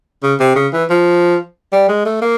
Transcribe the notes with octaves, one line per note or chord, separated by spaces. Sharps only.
C#3
C3
C#3
E3
F3
G3
G#3
A3
A#3